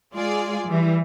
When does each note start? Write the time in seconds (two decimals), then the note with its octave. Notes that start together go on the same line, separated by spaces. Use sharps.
0.14 G#3 F4 G#4 D5
0.68 E3 G3